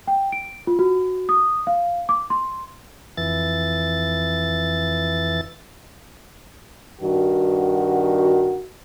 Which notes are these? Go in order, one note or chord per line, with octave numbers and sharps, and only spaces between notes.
G5
D7
F4
F#4
D#6
F5
D6
C6
F2 E3 A6
G2 D#3 F#4